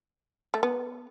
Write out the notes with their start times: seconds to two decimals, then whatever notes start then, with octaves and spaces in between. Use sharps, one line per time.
0.54 A3
0.63 B3